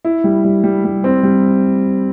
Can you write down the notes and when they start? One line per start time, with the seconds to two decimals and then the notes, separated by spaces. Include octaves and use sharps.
0.05 E4
0.24 G3
0.44 G3
0.64 G3
0.84 G3
1.04 C4
1.23 G3